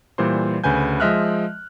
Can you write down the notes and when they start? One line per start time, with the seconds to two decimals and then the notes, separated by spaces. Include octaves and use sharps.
0.18 A#2 E3 G3 C5 C6
0.64 D2 C#3 B4 G#5 G6
1.00 F3 G#3 D#5 E5 F6 F#6